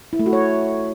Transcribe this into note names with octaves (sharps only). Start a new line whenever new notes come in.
E4
A3
F#4
C#5